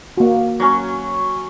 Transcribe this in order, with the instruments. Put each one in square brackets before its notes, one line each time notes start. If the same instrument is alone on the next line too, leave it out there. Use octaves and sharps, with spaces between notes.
[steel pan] A#3 F#4
[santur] F#3 C#4